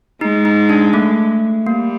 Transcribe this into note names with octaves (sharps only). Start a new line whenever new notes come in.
G#3 D#4
D#4
D4
A3
G3 A#3